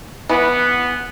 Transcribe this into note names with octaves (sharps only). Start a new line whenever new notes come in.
E3 B3